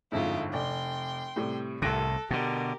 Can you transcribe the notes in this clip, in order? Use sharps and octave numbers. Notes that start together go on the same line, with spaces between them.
G1 F2 G#2 E4 F4
F1 D5 G5 C6
A2 C3 G3
C2 A2 C3 A4 F#6 A#6 D7
B2 D3 G4 A#4